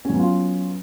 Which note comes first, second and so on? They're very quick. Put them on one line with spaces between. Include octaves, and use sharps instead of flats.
C#4 F#3 B3 F4